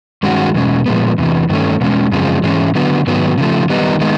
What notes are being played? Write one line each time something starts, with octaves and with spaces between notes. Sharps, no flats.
G2 D#3 G#3 C#4 F#4
E2 B2 G#3 C#4
A#2 F3 G#3 B3
E2 C3 E3
G2 D#3 F#3 A3 C#4
E2 B2 G#3 C#4
F#2 C#3 F3 G#3 C4
G#2 E3 G#3 C#4
D3 F#3 B3
G#2 D#3 F#3 B3
C#3 F3 A3
D#3 G3 B3 D#4
D#3 G#3 B3 D#4